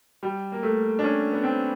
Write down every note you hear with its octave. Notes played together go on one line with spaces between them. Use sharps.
G3
A#3
A3
D4
C#4
B3
C4